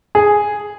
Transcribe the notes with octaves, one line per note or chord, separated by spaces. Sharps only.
G#4